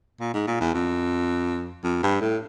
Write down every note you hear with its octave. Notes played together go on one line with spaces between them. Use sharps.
A#2
G#2
A#2
E2
F2
F2
G2
A2